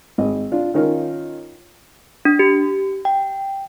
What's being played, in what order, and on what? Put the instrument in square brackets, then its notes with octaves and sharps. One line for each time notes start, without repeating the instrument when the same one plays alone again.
[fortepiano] G#1 D#5
D4 F4
D#3 C#4 D#4 F4 A#4
[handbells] D4
G4
G5